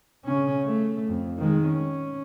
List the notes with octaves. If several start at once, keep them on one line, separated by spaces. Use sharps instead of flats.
C#3 C#4
A3
F2
D#3 G#3
C#4